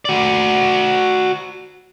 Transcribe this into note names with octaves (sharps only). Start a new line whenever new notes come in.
F#4 D5